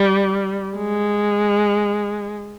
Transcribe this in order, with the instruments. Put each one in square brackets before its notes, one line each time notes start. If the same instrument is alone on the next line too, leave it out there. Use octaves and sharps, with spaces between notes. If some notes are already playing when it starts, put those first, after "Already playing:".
Already playing: [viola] G3
G#3